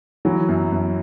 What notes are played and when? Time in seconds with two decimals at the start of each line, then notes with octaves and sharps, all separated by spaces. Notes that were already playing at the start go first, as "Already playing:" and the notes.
0.25 E3 F#3
0.49 F#2
0.72 F#2